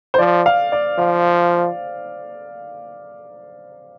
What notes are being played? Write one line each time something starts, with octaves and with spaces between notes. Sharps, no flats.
C5
F3 D5
F5
D5
F3 F5